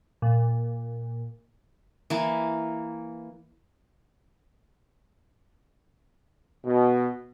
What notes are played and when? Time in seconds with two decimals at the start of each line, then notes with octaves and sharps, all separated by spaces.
0.22 A#2
2.10 E3 A#3
6.65 B2